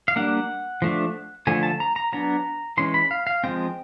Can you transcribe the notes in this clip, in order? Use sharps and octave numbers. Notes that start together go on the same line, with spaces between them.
F5
G3 A#3 D4 F#5
F3 A3 D4
D3 F3 A3 G#5
A5
A#5
A#5
F#3 B3 D4 A#5
E3 G#3 C#4 C6
B5
F5
F5
F3 G#3 C4 G5